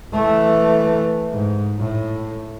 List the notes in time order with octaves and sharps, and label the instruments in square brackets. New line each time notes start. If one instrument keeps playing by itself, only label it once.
[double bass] E3 A3
G#2
A2